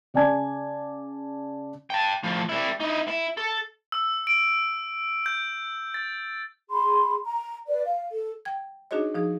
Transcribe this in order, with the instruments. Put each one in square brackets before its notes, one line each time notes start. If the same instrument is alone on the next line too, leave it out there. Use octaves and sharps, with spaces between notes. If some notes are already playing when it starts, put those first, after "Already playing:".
[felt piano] C#3 D5 G#5 A5 G#6
[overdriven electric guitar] G5 A5
A2 F3
G3 E4
D#4 E4
E4
A4
[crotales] E6
D7
G6
A6
[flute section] G#4 B5 C6
A#5
B4 D5
F5
A4
[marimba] G5 G#6
D4 D#4 F#4 G#4 C#5 D#5
F3 D#4 G#4